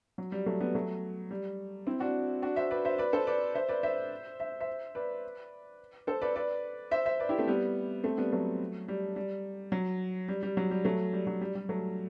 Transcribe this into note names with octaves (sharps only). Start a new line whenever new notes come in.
F#3
G3
F#3 A3
G3 B3
F#3 A3
G3
C4 E4
D4 F#4
D4 F#4
C5 E5
B4 D5
C5 E5
B4 D5
A4 C5
B4 D5
C5 E5
B4 D5
C5 E5
E5
C5 E5
B4 D5
A4 C5
B4 D5
B4 D5
C5 E5
C5 E5
B4 D5
E4 G4
A3 C4
G3 B3
A3 C4
G3 B3
F#3 A3
G3
G3
F#3
G3
G3
F#3
G3
F#3 A3
G3
F#3
G3
G3
F#3 A3